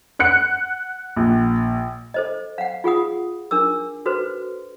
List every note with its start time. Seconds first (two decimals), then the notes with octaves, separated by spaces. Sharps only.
0.19 F#5 F#6 C#7
1.16 A#1
2.14 A4 C5 D#5
2.58 F5 F#5
2.84 F4 G#4 F#5 D#6
3.51 D4 A#4 D6 E6
4.06 F#4 A4 B4 C5